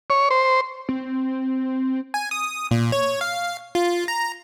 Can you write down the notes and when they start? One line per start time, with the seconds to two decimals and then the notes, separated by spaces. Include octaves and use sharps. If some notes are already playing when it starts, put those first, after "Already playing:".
0.10 C#5
0.31 C5
0.89 C4
2.14 G#5
2.31 D#6
2.71 A#2
2.92 C#5
3.21 F5
3.75 F4
4.08 A#5